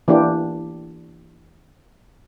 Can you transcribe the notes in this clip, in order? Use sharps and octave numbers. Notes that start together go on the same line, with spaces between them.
E3 A#3 D4 G4